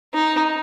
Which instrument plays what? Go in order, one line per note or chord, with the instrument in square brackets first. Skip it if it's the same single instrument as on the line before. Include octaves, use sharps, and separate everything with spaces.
[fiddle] D#4